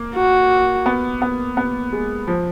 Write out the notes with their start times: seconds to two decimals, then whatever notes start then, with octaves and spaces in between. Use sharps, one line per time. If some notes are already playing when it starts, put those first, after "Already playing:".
Already playing: A#3
0.15 F#4
0.86 B3
1.22 B3
1.57 B3
1.93 G#3
2.28 F3